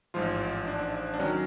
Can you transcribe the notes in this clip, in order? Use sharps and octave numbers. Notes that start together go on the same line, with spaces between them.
A1 G#2 F3 F4
D4
D4
D#3 F#3 C#4